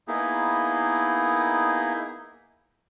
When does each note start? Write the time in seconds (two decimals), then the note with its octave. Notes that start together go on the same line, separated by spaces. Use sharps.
0.08 A#3 B3 D#4 E4 G#4